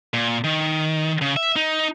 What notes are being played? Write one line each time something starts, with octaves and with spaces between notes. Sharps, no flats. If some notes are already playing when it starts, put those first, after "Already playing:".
A#2
D#3
C#3
E5
D#4